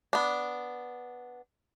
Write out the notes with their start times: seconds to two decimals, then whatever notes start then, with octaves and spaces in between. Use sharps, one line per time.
0.13 B3 D4